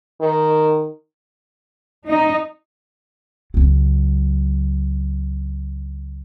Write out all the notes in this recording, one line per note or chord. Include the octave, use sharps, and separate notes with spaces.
D#3
D#4
C#2 F#3